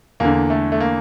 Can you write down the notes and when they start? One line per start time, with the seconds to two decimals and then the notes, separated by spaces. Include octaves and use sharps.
0.20 E2 D3 A#3
0.50 A3
0.72 A3
0.80 A#3